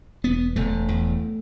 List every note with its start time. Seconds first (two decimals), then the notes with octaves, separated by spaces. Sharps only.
0.24 E1 B3
0.56 E1 A3
0.88 E2